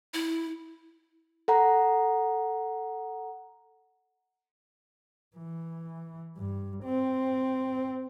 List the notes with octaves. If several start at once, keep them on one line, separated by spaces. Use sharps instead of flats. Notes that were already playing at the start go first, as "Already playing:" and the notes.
E4
A4 F#5 A#5
E3
G2
C4